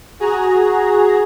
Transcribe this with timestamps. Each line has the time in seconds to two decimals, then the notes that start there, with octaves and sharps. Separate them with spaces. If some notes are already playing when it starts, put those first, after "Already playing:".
0.20 F#4 G#4 A#5